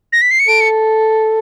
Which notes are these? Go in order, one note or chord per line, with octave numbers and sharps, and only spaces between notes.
A#6
B6
C7
C#7
A4 D7
C#7